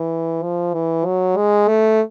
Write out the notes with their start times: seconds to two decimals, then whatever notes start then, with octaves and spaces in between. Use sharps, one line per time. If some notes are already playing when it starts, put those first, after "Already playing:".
Already playing: E3
0.43 F3
0.74 E3
1.06 F#3
1.37 G#3
1.68 A3